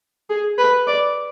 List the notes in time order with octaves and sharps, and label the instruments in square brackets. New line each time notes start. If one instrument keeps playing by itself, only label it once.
[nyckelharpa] G#4
B4
D5